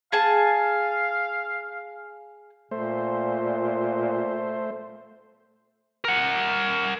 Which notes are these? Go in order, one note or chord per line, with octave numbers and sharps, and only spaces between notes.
G#4 F5 G#5 A5
A#2 A3 C5
A#4 F#5